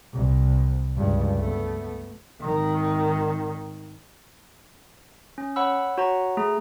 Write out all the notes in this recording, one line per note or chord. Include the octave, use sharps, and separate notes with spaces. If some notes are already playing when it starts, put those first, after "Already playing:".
C2
C#2 G2
A3 B3
G#1 D#3
C#4
C#5 F#5 B5 E6
F#4 C#5 F#5 A#5
A3 G#4 A#5